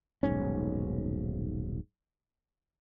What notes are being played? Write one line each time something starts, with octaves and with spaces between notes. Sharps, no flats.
D#1 B1 G#2 C#4